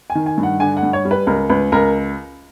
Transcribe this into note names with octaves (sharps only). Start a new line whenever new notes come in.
G#5
D#3
G#5
G2
F#5
D3 G#5
F#5
G2
C#5
G3
B4
C#2 A#4
C#2 B4
C#2 A#4